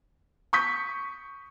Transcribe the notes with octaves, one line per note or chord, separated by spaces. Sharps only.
C#6 D#6 G6 B6